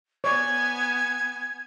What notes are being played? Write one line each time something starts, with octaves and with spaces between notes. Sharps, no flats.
B3 C#5 D5 G#5 G#6